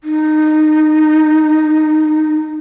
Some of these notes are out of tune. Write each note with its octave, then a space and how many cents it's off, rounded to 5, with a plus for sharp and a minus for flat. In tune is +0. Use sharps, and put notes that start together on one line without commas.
D#4 -15